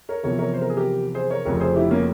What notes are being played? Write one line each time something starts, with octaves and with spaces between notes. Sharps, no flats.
A#4 C#5
E2 C3 F3 A#4 C#5
A#4 C#5
C5
A#4
G#4
G4 A#4
G#4 C5
A#4 C#5
F1 F2 C#3 A#4 C#5
G#4 C5
E4 G4
A#3 C#4